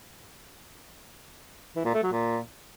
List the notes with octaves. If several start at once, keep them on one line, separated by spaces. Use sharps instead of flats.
E3
A#2
A3
F#3
A#2